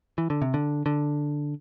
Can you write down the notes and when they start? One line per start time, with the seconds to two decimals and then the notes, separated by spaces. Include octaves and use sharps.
0.18 E3
0.30 D3
0.42 C3
0.54 D3
0.86 D3